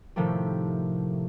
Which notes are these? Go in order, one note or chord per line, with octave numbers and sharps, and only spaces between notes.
A2 C3 D#3 F3 A3 G4